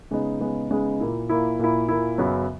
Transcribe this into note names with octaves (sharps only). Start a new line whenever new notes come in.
C#3 G#3 B3 D#4
C#3 G#3 B3 D#4
C#3 G#3 B3 D#4
A#2 A#3 E4
A#2 A#3 E4
A#2 A#3 E4
A#2 A#3 E4
F#2 C#3 F#3 B3 F#4